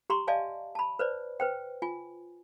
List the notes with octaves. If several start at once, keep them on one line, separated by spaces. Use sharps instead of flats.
G4 A#5 C6 C#6
D5 D#5 F5 G#5 A5
A5 B5
B4 C5 D5
B4 C5 G5
F4 G#5